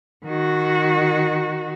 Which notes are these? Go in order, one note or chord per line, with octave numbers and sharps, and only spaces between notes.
D#3 F#4